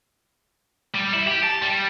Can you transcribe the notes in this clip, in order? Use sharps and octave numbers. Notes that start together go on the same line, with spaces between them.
G3
E4
G4
A5
G3